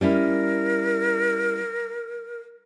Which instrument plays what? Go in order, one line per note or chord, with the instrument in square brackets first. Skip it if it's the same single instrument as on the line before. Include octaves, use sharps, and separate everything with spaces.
[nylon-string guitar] G3 C#4 E4 [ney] A#4